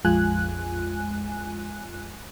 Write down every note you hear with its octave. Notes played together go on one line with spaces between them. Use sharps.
A#1 F2 G#3 F4 G#5 F#6